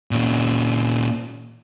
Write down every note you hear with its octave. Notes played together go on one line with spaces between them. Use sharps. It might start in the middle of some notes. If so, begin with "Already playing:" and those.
A#2 C#4